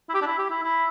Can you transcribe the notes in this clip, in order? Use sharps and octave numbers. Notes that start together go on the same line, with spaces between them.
E4
G4
D4
E4
G4
E4
E4